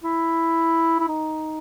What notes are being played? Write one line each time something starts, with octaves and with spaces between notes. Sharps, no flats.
E4
E4
D#4